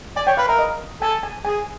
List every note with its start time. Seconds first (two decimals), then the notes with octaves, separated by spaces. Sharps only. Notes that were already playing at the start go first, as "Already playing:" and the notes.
0.16 D5 G#5
0.27 C#5 G5
0.37 B4 F5
0.48 A#4 E5
0.59 D#5
1.02 A4 G#5
1.23 G#5
1.45 G#4 G#5